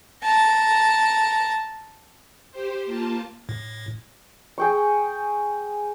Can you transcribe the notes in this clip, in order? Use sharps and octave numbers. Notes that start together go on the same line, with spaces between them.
A5 A#5
G4 C5
A#3 F4 A5
A2
G#4 G5 C#6